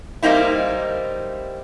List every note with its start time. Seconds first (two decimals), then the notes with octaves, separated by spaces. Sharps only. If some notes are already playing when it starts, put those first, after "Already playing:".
0.23 G3 A#3 C4 D#4 E4